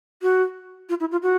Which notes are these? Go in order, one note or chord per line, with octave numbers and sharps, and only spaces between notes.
F#4
F4
E4
F4
F#4